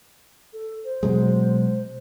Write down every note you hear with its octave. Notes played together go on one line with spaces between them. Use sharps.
A4
C5
B2 F#3 G#3